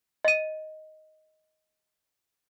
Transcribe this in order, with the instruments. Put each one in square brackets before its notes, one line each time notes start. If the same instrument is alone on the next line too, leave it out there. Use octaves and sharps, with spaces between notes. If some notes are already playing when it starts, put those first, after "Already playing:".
[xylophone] D#5 D#7